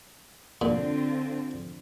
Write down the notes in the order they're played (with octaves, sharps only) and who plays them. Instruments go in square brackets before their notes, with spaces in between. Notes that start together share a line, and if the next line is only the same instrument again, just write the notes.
[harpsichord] A#2 [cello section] D3 C4 F4